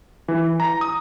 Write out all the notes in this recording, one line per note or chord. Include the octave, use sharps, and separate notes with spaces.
E3
A#5
D#6